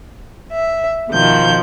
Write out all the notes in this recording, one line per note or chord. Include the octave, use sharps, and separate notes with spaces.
E5
B2 D#3 F3 G6